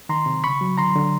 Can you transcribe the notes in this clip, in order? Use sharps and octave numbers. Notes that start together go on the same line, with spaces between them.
D#3 A#5 C6
C3
C#3 B5 C#6
F#3
D3 A#5 C6
D3